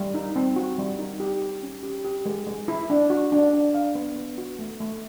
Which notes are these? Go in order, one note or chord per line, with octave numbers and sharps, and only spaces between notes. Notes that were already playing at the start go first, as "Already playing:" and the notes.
Already playing: G3
D#4
C4
F#4
G3
D#4
G4
G4
C#4
G4
G4
G#3
G#3
E4
D4
F#4
D4
D4
D4 F5
B3
B3
F#4
A3
A3